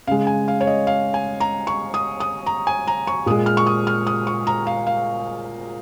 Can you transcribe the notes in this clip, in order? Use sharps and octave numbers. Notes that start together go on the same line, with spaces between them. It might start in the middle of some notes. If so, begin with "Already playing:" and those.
C#3 G#3 F5
G#5
F5
C#5
D#5
F5
G#5
A#5
C#6
D#6
D#6
A#5
G#5
A#5
C#6
A#2 G#3 D#6
F6
C#6
D#6
F6
D#6
C#6
A#5
F5
F5